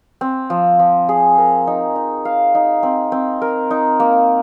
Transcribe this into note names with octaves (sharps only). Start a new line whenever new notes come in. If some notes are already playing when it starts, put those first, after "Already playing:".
C4
F3
F3
G#4
A#4
D#4
D#4
F5
D#4
C4
C4
A#4
D#4
A#3